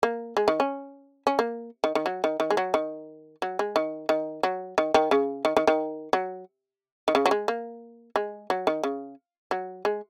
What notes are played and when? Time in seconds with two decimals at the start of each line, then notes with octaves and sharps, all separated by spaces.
0.03 A#3
0.37 G#3
0.48 D#3
0.60 C#4
1.27 C#4
1.39 A#3
1.84 D#3
1.95 D#3
2.06 F#3
2.24 D#3
2.40 D#3
2.50 G#3
2.57 F#3
2.74 D#3
3.42 F#3
3.59 G#3
3.76 D#3
4.09 D#3
4.43 F#3
4.78 D#3
4.94 D#3
5.11 C#3
5.45 D#3
5.57 D#3
5.67 D#3
6.13 F#3
7.08 D#3
7.15 C#3
7.26 F#3
7.31 G#3
7.48 A#3
8.16 G#3
8.50 F#3
8.67 D#3
8.83 C#3
9.51 F#3
9.85 G#3